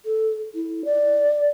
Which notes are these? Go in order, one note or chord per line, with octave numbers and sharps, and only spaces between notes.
A4
E4
D5